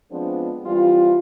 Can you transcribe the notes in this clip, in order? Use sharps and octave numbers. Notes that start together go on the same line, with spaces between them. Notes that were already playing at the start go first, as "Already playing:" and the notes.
F3 G#3 B3 C4 D4
E3 G3 C4 F4